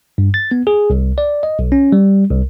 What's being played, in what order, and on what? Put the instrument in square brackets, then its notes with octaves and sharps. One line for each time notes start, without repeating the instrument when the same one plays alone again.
[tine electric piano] G2
A6
B3
G#4
C2
D5
D#5
B1
C#4
G3
C2